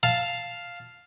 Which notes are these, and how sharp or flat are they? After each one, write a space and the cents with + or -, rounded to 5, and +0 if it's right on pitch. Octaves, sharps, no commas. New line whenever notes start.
F5 +0 A5 +0